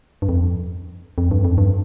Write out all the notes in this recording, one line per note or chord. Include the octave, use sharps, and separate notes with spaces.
G2
F2
F2
G2
F2
G2